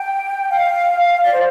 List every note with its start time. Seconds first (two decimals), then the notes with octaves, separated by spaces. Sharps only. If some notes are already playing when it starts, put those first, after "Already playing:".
Already playing: G5
0.50 F5
1.23 D5
1.33 C5